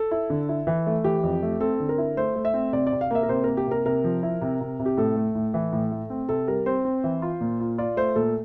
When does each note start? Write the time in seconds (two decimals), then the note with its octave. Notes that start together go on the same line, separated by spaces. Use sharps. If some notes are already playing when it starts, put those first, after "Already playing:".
Already playing: A4
0.11 E4
0.30 D3
0.49 E4
0.67 E3
0.87 A3
1.04 E3 G4
1.23 F2
1.42 A3
1.60 C4 A4
1.80 D3
1.89 A#4
1.98 E4
2.17 A3 C5
2.36 A3
2.45 E5
2.54 C4
2.73 C3 D5
2.87 D5
2.92 C3
3.01 F5
3.11 A#3 E5
3.23 A#4
3.29 C3 C5
3.44 A#3 A#4
3.57 G4
3.67 C3 A#4
3.86 C3 A#4
4.04 F3
4.23 E4
4.41 C3
4.61 C3
4.79 C3
4.86 G4
4.97 A2 A4
5.16 A3
5.35 A2
5.54 E3
5.72 A2
5.92 A3
6.10 C4
6.29 C3 A4
6.47 G3 A#4
6.66 C4 C5
6.85 C4
7.04 E3
7.22 F4
7.41 A#2
7.60 F4
7.78 F4 D5
7.97 A3 C5
8.16 A#2 A4